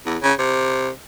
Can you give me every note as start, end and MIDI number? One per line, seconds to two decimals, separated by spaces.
0.06 0.18 40
0.23 0.33 49
0.39 0.90 48